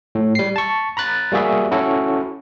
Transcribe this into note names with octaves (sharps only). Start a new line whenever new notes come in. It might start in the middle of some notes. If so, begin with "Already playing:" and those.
A2
G3 C7
A5 C#6
A#5 B5 F#6 A6
G3 A#3 F#4 G#4 E5
C#4 E4 F#4 A4